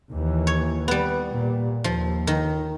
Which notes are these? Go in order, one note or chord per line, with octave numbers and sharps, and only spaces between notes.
D#2 E3
C#5
G3 B3
A#2
D#2 F3
D#3